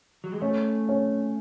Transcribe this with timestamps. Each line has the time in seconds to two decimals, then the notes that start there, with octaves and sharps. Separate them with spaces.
0.24 F#3
0.32 G#3
0.41 A3 C#4
0.89 C#4